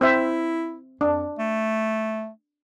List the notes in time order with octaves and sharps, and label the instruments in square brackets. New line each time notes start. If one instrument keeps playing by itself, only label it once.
[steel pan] C4 C5 E5 [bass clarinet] E4
[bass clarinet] F2 [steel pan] D4
[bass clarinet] A3